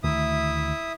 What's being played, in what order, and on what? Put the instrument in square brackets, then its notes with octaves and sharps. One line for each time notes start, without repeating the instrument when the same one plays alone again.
[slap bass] D2 D#3 A3 [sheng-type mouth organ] E4 E5 D#6